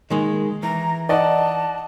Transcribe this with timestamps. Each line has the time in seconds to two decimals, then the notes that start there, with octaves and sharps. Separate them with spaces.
0.10 D#3 G#3 A#3
0.63 E3 A#5
1.09 D5 D#5 F#5 A5